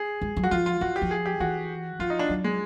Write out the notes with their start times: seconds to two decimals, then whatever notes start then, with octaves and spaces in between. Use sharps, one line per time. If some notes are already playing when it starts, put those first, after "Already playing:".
Already playing: G#4
0.22 G#3
0.37 F#3
0.43 F#4
0.51 F3 F4
0.66 F4
0.81 F3 F#4
0.96 G4
1.02 F3
1.11 G#4
1.26 G4
1.40 E3 F#4
1.99 F3 F4
2.10 D#4
2.19 D4
2.29 F#3
2.44 G#3